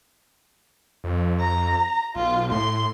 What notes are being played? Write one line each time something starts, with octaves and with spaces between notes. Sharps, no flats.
F2
A#5
B1 F4
A2 C6